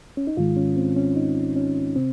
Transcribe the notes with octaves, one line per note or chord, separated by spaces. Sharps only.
C#4
D#4
G#2 D#3 G#3 F4
C#4
C4
C#4
D#4
C#4
C3 C4